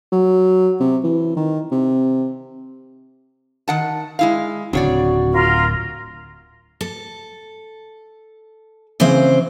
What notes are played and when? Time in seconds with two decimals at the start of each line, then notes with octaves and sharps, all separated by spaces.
0.12 F#3
0.80 C3
1.04 E3
1.36 D#3
1.71 C3
3.68 D#3 F#5 A5
4.19 G#3 E4 F5
4.73 D1 C#3 C4 D4 F#4 C#5 D5
5.33 F4 A#4
6.81 A4
9.00 C#3 E3 C4 C5 F5